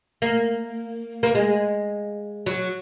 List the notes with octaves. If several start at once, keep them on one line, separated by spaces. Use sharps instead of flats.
A#3
A#3
G#3
F#3